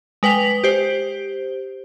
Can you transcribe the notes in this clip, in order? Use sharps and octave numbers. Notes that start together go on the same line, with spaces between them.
G#3 B4 G5 B6 F7
G4 C5